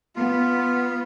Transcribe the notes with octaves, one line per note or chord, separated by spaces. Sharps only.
B3 F4